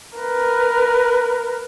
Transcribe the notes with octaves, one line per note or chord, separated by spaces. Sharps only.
A#4 B4